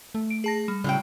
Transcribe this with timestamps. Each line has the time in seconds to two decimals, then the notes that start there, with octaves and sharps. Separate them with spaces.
0.15 A3
0.30 D7
0.44 G#4 A5 A#6
0.68 G3
0.84 A2 C#3 F#3 G5